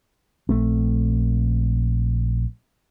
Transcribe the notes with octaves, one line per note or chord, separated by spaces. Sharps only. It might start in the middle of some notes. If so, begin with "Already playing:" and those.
A#1 A3 C4